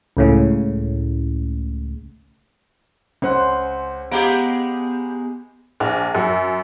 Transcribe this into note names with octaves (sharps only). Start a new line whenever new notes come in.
C#2 A2 C#3
C#2 C#4 C5 F#5 F#6
G#3 B3 G4 G#4 F5 F#5 A#5
A#1
F#2